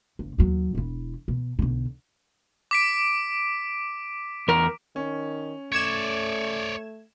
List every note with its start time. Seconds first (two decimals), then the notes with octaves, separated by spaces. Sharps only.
0.19 G1
0.38 D#2 F#3
0.75 E1 E4
1.28 B2
1.59 B1 D3
2.71 D6 B6 D7
4.48 E2 A#4
4.96 D#3 C#4
5.72 A3 C#5 D5 G#6 E7